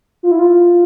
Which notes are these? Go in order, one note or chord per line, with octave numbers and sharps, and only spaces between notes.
F4
E4
F4